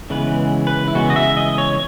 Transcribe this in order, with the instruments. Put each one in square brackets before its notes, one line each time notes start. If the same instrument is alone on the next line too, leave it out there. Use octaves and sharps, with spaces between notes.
[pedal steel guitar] C#3 E3 G#3 B3 B4
B4
E4
C#3 E3 G#3 B3 F#4
D#5
E5
D#5
C#5